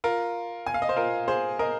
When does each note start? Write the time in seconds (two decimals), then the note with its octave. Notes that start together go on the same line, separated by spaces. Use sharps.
0.04 F4 A#4
0.66 G#5
0.74 F5
0.82 D#5
0.89 C5
0.96 F4 A#4
1.28 G#4 C5
1.59 A#4 D#5